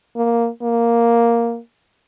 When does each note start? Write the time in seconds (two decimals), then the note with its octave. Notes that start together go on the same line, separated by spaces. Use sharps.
0.17 A#3
0.62 A#3